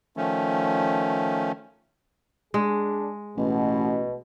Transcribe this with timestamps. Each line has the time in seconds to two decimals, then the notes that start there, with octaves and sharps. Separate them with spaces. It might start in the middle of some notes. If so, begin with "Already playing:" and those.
0.17 D#3 F3 A3 C#4
2.54 G#3 D4 G#4
3.37 A1 B2